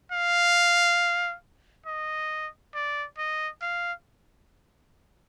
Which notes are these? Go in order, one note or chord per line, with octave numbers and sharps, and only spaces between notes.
F5
D#5
D5
D#5
F5